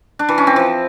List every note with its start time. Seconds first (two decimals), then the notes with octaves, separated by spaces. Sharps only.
0.19 D4
0.29 E3
0.38 C#4
0.47 C4
0.56 F3